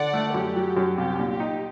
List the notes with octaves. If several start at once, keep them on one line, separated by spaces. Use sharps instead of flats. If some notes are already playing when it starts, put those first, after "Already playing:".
Already playing: D3 D5 F#5
A3
F#2 G4
F#3
F#2
C2 G4
A#2
G4
D#4